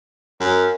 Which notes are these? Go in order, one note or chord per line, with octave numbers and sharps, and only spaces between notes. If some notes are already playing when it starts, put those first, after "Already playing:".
F#2